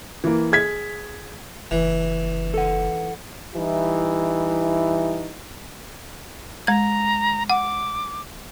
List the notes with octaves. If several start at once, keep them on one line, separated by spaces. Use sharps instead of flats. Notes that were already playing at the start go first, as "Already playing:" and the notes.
E3 A#3
G#4 G#6 B6
F#1 E3
A4 F#5
E3 G3 D#4 E4
G#3 A#5 G#6
F#5 D6